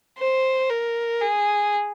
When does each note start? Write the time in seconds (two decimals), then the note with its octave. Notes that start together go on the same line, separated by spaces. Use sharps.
0.18 C5
0.70 A#4
1.21 G#4